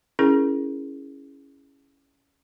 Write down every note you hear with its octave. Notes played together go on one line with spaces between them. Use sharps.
C#4 E4 G#4 A#4